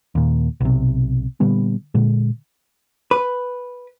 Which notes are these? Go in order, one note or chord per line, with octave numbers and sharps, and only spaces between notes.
D#2 A#2
B1 C3
A#2 D3 G3 B3
A#2 D3 G#3
B4